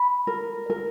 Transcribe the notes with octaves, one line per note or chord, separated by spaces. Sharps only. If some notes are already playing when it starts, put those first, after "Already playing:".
Already playing: B5
A#4
A#4